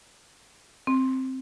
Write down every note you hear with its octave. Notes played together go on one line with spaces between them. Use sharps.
C4